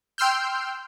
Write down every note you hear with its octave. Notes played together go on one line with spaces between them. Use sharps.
G5 C6 E6 F6 G6